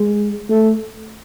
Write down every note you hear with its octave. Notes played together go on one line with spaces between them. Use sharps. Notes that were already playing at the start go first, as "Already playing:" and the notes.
Already playing: G#3
A3